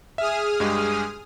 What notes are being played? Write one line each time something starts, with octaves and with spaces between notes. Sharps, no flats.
G#4 E5 D#6 F6
G2 G#3 G4